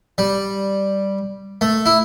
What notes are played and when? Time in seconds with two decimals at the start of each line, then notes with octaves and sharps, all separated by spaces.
0.18 G3
1.61 A3
1.86 E4